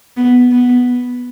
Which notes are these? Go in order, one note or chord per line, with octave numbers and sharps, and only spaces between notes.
B3
B3